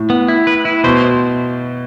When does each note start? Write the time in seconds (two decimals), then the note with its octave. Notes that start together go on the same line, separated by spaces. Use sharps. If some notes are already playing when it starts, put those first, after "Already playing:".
Already playing: A2
0.10 B3
0.28 E4
0.47 B4
0.65 E4
0.84 B2 C5